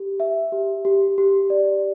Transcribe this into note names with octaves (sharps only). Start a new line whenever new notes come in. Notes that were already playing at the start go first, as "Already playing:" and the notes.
Already playing: G4
E5
G4
G4
G4
D5